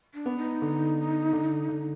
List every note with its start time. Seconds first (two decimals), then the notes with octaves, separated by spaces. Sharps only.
0.14 D4
0.26 B3
0.37 D#4
0.62 D3
1.33 D3
1.69 D3